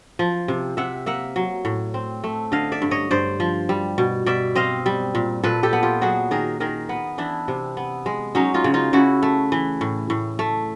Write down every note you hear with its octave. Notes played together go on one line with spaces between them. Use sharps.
F3
C3
C3 E5 F#5
A#3 E5 F#5
F#3
A2
C4
A3
D3 D#5 F5
D5 E5
G2
C#5 D#5
G2 C5 D5
F3
G3
B2
B2 D5 E5
C4 D#5 F5
G3
A#2
A#2 A4 B4
G4 A4
B3
F4 G4
F#3 F#4 G#4
D#3 G#4 A#4
D#3 G#4 A#4
B3
E3 D4 E4
C3
B3
G#3
F#3 C#4 D#4
D#4 F4
C#3
D#4 F4
C#3 E4 F#4
A3
E3
A2
A2
A3